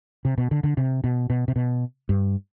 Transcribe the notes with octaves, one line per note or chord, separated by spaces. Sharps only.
C3
B2
D3
D3
C3
B2
B2
C3
B2
G2